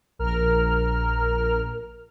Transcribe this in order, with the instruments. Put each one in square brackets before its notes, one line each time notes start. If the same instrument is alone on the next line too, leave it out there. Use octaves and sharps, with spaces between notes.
[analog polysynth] A#1 A#4 F6